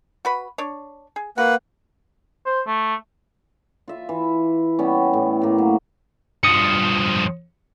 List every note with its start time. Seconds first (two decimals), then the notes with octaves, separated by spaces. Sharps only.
0.25 F#4 B4 B5
0.58 D4 C#5
1.16 G#4
1.38 A#3 F#4 B4 F#5
2.46 C5
2.67 A3
3.88 F4 E5
4.09 E3
4.79 G3 B3 C#4
5.13 A2
5.42 A2 A#3
5.58 F#3
6.43 G2 F3 D#6 C#7